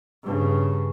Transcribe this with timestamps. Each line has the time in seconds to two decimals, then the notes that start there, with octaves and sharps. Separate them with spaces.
0.23 G2 C#3